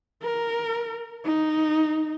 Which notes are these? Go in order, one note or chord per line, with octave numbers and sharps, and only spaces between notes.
A#4
D#4